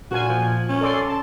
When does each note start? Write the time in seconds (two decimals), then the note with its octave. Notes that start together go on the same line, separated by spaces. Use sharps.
0.11 A#2 F4 F#4 G#5
0.29 F3
0.69 C#4
0.81 A4 D5 C6
1.08 A5